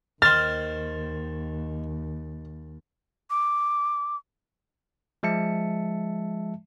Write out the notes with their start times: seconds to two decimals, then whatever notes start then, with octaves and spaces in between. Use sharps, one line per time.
0.22 D#2 D#3 C5 F6 A6
3.30 D6
5.23 F3 G#3 E5 A5 C#7